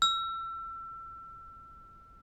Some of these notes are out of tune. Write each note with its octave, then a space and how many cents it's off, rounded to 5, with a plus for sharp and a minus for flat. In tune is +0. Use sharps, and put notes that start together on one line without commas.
E6 +30